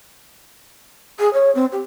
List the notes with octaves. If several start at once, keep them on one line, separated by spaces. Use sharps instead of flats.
G#4
C#5
C4
G4